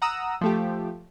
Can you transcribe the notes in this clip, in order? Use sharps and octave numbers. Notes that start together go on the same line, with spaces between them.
F#5 A#5 D#6 E6
F3 A3 G4